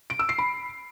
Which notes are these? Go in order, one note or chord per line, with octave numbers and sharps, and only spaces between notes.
D7
E6
C7
B5